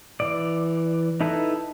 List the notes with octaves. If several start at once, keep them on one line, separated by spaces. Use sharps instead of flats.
E3 D5
D#4 E4 A4 B4